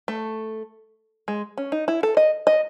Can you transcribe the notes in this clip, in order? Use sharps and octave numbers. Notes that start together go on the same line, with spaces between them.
A3
G#3
C#4
D#4
E4
A4
D#5
D#5